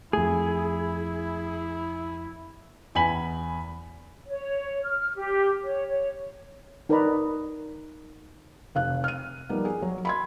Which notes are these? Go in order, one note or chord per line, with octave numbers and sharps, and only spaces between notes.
F2 A3 E4 G#4
E2 G#5 B5 B6 F#7
C#5
F6
G4
C#5
C#5
D#4 A#4 B4 D5 A#5 B5
F1 F5 F#6
F6 D#7
F3 G3 A#3 B3 D#4
G#4
F#3 C#5
B5 C6 G#6